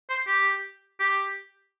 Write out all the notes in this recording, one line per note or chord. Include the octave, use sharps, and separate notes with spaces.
C5
G4
G4